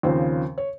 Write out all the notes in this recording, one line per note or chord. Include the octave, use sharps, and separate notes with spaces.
D#2 C#3 F3 C4 C5
C#5